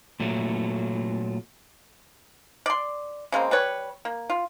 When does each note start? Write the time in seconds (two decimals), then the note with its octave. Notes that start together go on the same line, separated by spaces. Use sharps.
0.20 A#2 F#3 A3
2.66 D5 C6
3.32 C#3 G#3 A#3 C4
3.51 G3 B4 C#5
4.05 A#3
4.30 F4